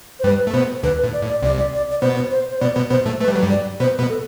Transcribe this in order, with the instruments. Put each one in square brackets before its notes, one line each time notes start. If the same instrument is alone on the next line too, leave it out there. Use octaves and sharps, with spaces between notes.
[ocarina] C5
[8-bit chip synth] G2 G3 [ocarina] B4
[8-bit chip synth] A3
[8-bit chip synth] B2 B3 [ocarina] C5
[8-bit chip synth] D2 D3 [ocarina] B4
[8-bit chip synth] A2
[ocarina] D5
[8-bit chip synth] A2
[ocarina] D5
[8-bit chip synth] C2 C3 [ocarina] D5
[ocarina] D5
D5
D5
[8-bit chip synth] B2 B3 [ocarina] C5
[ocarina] C5
C5
[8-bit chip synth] B2 B3 [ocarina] D5
[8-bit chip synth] B2 B3
[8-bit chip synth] B2 B3 [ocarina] C5
[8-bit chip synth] A2 A3
[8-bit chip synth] A3 [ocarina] B4
[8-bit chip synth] G3
F#3
G2 G3
[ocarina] D5
[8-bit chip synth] B2 B3 [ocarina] C5
[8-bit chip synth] B2 B3
[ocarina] A4